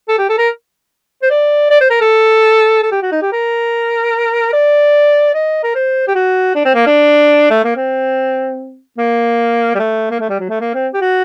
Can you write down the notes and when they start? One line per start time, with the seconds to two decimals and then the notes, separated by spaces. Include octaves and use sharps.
0.08 A4
0.18 G4
0.29 A4
0.38 A#4
1.22 C5
1.30 D5
1.70 D5
1.81 C5
1.90 A#4
2.01 A4
2.83 A4
2.91 G4
3.02 F#4
3.12 D#4
3.22 G4
3.32 A#4
4.53 D5
5.34 D#5
5.63 A#4
5.75 C5
6.07 G4
6.15 F#4
6.55 D4
6.65 C4
6.75 A#3
6.86 D4
7.50 A3
7.64 A#3
7.76 C4
8.98 A#3
9.75 G3
9.79 A3
10.11 A#3
10.20 A3
10.29 G3
10.40 F#3
10.49 A3
10.60 A#3
10.74 C4
10.94 G4
11.01 F#4